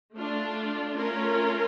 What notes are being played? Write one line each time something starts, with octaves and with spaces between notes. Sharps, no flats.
A3 D4 F4
A3 C#4 F4 A#4